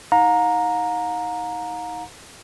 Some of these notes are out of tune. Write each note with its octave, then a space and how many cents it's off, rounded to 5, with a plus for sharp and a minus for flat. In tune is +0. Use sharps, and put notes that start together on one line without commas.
D#4 +35 F5 +45 A#5 +0